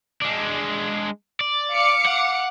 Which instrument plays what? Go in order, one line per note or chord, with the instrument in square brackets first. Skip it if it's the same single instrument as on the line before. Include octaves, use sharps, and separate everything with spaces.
[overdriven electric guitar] G#3 D4
D5
[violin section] F5 D6 C#7
[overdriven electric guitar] F#5